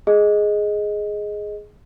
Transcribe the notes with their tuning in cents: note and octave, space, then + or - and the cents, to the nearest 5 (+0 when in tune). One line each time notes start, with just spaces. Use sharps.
G#4 +10 D#5 +0